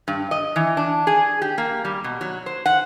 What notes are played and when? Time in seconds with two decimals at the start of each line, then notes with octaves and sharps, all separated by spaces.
0.08 G2
0.31 D#5
0.56 E3
0.77 D4
1.07 G#4
1.42 G4
1.58 A#3
1.85 G3
2.04 B2
2.21 F#3
2.46 C5
2.66 F#5